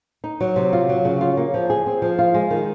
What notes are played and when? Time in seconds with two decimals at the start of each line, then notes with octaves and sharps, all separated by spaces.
0.24 D#4
0.41 F#3
0.56 C3
0.73 F4
0.89 F#3
1.05 C#3
1.21 F4
1.37 A#3
1.54 F3
1.70 G#4
1.86 C4
2.02 F3
2.19 F4
2.34 G#3
2.51 D#3